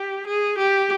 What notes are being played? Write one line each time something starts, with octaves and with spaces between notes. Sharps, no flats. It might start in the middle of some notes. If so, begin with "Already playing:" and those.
Already playing: G4
G#4
G4